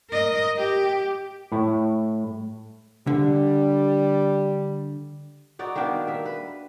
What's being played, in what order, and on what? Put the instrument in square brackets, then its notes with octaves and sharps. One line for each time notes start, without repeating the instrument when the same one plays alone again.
[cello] A#4 D#5
G4
[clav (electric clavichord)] A2 E4
[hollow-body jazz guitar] D3 [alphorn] G3
[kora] D#4 F#4 D5
D#3 A#3 B3 D4
A#3 E5
B4